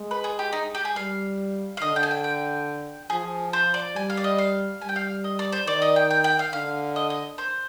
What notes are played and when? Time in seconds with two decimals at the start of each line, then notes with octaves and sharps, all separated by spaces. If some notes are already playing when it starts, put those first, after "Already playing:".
Already playing: G#3
0.11 B4
0.24 G#4
0.39 G4
0.53 D#4
0.75 G4
0.85 G#4
0.96 G3 F5
1.77 F5
1.81 D3 D#5
1.96 G5
2.03 G#5
2.11 G5
2.24 G5
3.10 F3 G#4
3.53 C5
3.74 D5
3.96 G3 G#5
4.10 F5
4.17 D5
4.24 D#5
4.38 F5
4.82 G3 G#5
4.89 G5
4.96 F5
5.24 D#5
5.39 D5
5.52 C5
5.67 D#3 D5
5.82 D#5
5.96 G5
6.11 G5
6.24 G5
6.39 F5
6.53 D3 F5
6.96 D#5
7.10 D#5
7.38 C5